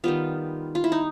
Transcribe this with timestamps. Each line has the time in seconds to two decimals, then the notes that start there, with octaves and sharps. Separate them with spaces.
0.04 D#3 G3 B3 F4
0.75 F4
0.84 E4
0.92 D#4